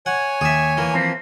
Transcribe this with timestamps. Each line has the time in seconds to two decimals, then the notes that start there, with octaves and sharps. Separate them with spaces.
0.06 C#5 F#5 G#5
0.41 D#2 G#4 E5
0.77 E3 A#3
0.94 F3 C4